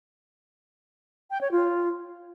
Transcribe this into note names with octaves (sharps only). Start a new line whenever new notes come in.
G5
C#5
F4